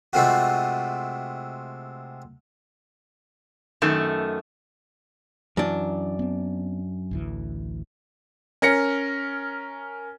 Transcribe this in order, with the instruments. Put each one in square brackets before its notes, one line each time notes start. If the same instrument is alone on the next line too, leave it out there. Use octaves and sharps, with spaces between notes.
[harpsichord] C3 G#3 A3 C4 F4 F#4
[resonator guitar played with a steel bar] F#2 D#3 A3
[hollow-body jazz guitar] F#2 D4 [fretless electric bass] E3
[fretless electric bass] B3 C4
A1 D2 E3
[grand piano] C#4 A#4 A#6 C#7